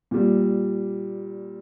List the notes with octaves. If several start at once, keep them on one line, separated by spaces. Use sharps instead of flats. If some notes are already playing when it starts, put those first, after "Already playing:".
A#2 G3